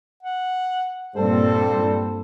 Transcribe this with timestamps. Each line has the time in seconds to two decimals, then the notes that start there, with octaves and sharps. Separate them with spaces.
0.23 F#5
1.16 G2 A#2 G3 C4 A4 C5